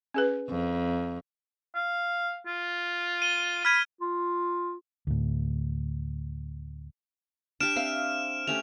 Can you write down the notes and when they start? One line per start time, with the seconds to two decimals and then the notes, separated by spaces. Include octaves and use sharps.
0.14 C#4 G#4 B4
0.49 F2
1.75 F5
2.46 F4
3.22 D#7 G7
3.65 B5 F6 G#6 D#7
4.01 F4
5.07 D2 A2
7.60 D4 G4 F6 D7 E7
7.76 C4 E5 F5
8.48 A3 C#4 G4 F7